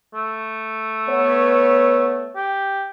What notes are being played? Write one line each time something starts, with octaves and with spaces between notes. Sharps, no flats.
A3
B3 C#5
G4